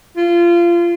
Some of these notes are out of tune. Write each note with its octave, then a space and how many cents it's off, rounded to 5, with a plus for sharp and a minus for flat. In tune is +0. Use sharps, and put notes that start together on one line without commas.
F4 -25